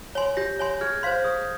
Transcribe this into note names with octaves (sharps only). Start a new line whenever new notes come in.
C#5 G#5 C6
G4 G6 A#6
C#5 G#5 C6
G#4 F6 G#6
C5 F5 C6 G6
G#4 D#6